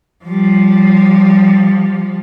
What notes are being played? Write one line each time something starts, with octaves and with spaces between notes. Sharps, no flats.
F3 G3